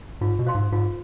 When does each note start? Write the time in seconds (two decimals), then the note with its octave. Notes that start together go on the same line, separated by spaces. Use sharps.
0.21 G#2 F4
0.39 B2
0.47 C5 F5 C6
0.55 G#2
0.72 G#2 F4